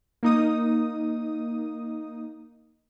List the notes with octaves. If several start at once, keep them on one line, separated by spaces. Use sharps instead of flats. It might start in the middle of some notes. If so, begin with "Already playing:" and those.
A#3 D#4 D#6